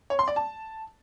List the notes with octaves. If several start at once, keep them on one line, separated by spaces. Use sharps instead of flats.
C#5
C6
D5
A5